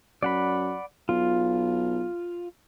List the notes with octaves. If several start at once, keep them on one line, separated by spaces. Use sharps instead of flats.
F#2 D5 F#5 B5
B1 F4